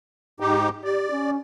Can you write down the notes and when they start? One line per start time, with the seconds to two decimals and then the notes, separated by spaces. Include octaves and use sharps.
0.40 G#2 D#4 G4
0.84 G4 D5
1.11 C#4